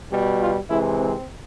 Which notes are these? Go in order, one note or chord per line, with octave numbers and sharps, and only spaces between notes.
B2 G3
F4
C3 E3 G#3 E4
C4